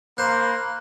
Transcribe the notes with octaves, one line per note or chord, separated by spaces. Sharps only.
A#3 C5 B5 F#6